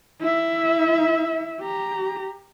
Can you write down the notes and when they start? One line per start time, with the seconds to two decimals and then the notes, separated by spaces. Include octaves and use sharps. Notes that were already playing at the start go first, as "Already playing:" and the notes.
0.20 E4 E5
1.61 G4 A#5